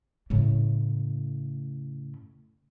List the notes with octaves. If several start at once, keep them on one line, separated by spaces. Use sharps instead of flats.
A2 C#3